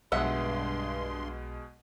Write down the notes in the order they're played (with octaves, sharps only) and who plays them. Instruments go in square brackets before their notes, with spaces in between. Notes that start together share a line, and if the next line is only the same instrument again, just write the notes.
[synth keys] B1 [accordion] G2 C6 [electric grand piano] B2 G#3 [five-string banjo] D#5 E5 F#5